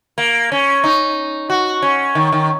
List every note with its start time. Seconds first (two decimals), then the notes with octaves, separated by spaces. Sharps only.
0.18 A#3
0.52 C#4
0.84 D#4
1.50 F#4
1.82 C#4
2.15 D#3
2.32 D#3